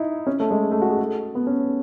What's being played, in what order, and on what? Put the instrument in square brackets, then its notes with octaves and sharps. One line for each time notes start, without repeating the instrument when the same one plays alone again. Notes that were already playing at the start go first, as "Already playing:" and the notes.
Already playing: [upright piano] D#4 E4
C#4
A3
G#3
A3
F#4
G#4
A4
B3
C#4